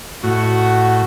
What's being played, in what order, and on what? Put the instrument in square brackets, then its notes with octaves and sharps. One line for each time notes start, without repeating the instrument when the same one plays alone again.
[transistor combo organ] A2 [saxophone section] F#4